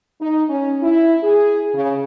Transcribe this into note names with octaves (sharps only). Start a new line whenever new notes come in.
D#4
C#4
E4
G#4
C#3